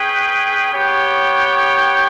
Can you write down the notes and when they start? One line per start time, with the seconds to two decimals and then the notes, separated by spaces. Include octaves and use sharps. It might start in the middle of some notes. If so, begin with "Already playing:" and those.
Already playing: C#4 G#4 B4 G5
0.71 B3 G4 C#5 G5